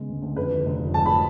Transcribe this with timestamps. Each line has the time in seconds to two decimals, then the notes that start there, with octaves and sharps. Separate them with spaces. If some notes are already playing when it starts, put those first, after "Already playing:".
Already playing: C#3 G#3 B3
0.09 D2
0.22 D2
0.36 F2 B4
0.51 D3
0.66 F1
0.79 F3
0.94 G#2 A5
1.06 F#3 B5